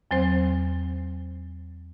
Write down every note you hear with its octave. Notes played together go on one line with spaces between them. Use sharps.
E2 F#3 C4 C5